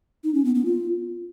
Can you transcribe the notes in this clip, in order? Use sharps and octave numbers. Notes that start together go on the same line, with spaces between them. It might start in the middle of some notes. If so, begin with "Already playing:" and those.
D#4
C#4
B3
B3
F4